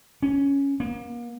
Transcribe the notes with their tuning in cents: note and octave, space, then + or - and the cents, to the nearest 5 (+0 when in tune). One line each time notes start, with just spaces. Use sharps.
C#4 +5
A#3 +35